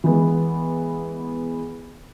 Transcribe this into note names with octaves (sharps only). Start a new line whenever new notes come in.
E3 G#3 B3